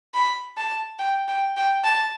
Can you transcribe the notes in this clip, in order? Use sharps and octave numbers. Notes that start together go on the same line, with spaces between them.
B5
A5
G5
G5
G5
A5